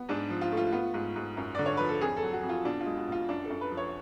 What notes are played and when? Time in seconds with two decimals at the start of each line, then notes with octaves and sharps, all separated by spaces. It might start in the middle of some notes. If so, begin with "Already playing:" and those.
Already playing: B3
0.09 G#2 D4
0.30 F3
0.41 F4
0.52 A3
0.57 F4
0.72 B3 F4
0.94 G#2
1.16 G#2
1.37 F#2
1.55 D3 D5
1.66 C#5
1.77 F3 B4
1.89 A4
2.01 F2 G#4
2.17 A4
2.22 F#3
2.33 F#4
2.43 F2
2.49 F4
2.65 B2 D4
2.81 F4
2.86 G#3
2.97 F#4
3.07 B2 F4
3.28 F#2 D4
3.45 A4
3.50 F#2
3.61 B4
3.71 F3
3.77 C#5